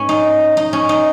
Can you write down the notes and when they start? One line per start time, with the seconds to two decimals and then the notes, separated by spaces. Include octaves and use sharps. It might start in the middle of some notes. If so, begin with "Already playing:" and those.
Already playing: G#2 B3 C#4
0.09 D#4
0.57 D#4
0.73 C#4
0.89 D#4